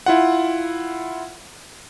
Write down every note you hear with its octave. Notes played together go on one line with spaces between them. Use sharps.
E4 F4 F#5